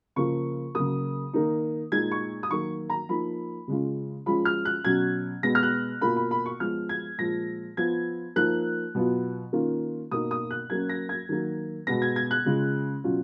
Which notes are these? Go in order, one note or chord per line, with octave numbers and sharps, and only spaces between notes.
C#3 F3 A#3 F4 C#6
C#3 F#3 A#3 D#6
D#3 A#3 D#4
A#2 G#3 D#4 G#6
C#6
D#6
D#3 F#3 A#3 C#6
A#5
F3 A#3 D#4 B5
C#3 G#3 C#4 F4
F3 G#3 C#4 F4 B5
F6
F#6
B2 F#3 C#4 G#6
B2 G#3 B3 A#6
F6
F#6
B2 A#3 F4 B5
B5
B5
C#6
F3 G#3 B3 F4 F6
G#6
A#2 F3 G#3 A#6
F3 B3 F4 G#6
F3 A#3 D#4 F#6
B2 F#3 B3 F4
D#3 A#3 C#4 F4
B2 A#3 D#4 D#6
D#6
F#6
F#3 A#3 C#4 G#6
A#6
G#6
D#3 F#3 A#3
B2 G#3 B3 A#6
G#6
G#6
F#6
C#3 G#3 C#4 F4
B2 F#3 C#4 F4